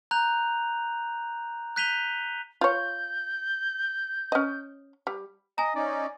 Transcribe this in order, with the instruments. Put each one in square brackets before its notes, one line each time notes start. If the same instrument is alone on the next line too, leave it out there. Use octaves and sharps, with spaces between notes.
[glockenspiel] A#5 F#6 G6 F7
F#6 G6 B6 D#7 F7 G7
[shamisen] F4 C#5 [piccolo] G6
[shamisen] C#4 D#5
G3
[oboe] D#5 [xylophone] G#5 A#5
[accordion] C#4 D#4 [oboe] D5